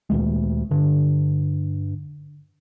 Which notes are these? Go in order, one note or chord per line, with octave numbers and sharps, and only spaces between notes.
D2 A#2 D#3 G#3
G2 D3